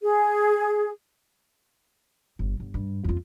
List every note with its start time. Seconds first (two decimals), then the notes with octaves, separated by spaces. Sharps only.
0.02 G#4
2.39 G1
2.60 G1
2.74 G2
3.04 F2 F4